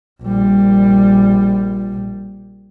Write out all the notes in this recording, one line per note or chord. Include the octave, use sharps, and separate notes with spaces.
A#1 G3